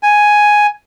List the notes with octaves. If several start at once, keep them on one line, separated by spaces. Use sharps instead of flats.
G#5